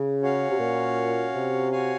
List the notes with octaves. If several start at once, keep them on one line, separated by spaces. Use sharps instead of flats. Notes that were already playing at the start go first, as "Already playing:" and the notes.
Already playing: C#3
C#4 F#4 C#5 F5
C3
A#2
C3
F#4 C#5 F5 G#5